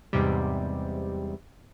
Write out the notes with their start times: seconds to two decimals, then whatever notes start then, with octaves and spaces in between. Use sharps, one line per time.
0.13 E2 G#2 C3 G3